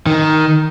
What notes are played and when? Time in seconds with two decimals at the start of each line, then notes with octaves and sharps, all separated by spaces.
0.06 D#3